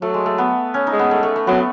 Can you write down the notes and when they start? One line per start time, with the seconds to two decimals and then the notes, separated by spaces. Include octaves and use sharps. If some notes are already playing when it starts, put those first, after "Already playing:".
0.02 F#3 A3
0.14 G#3
0.26 A3
0.38 B3
0.74 C#4
0.87 D#4
0.93 G#3
0.99 B3
1.11 A3
1.23 A3
1.36 A3
1.47 F#3 B3